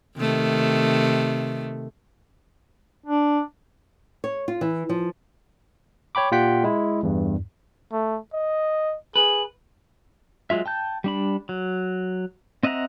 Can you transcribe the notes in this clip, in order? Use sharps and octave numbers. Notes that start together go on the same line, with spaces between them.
C3 D#3 A3
D4
C#5
F4
E3
F3
C#5 G5 B5 D6
A#2 F4 G4 F#5 G5 B6
G#3 E4
E2 G2
A3
D#5
G#4 B4
F#3 G#3 F4 E5
G5 A5 G6
G3 D4 B5
F#3
C4 D#5 E5 F#5 A#5